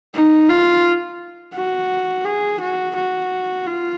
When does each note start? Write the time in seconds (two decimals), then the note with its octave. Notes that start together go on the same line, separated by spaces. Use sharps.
0.15 D#4
0.50 F4
1.55 F#4
2.25 G#4
2.61 F#4
2.96 F#4
3.67 F4